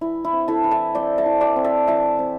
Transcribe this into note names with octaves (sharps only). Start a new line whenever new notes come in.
E3 E4
E4
C4
E4 A4
E3
E5 A5
C4 D5 G5
E5 A5
E3
D5 G5
C4
E5 A5
E3 E5 A5
C4